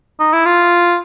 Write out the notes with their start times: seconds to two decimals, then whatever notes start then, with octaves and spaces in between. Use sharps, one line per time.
0.20 D#4
0.33 E4
0.46 F4